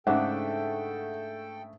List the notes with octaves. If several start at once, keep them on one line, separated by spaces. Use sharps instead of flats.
G#2 C#3 A3 D4 A4 F#5 G5